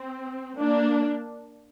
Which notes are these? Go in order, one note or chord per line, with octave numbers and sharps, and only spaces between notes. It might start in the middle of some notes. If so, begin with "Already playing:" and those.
Already playing: C4
A#3 D4